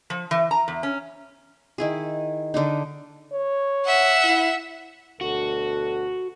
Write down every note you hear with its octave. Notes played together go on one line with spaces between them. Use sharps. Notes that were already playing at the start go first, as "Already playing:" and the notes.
F3
E3
A#5
E2
C#4
D#3 E4 G#4
D3 D4 D#4
C#5
E5 F#5
E4
D2 B2 F#4 A4